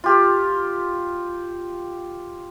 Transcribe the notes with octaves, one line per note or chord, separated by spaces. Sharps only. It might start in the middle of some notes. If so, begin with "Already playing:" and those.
F4 G4